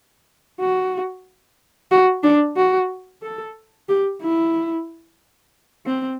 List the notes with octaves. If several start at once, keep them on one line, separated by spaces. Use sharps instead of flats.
F#4
F#4
D4
F#4
A4
G4
E4
C4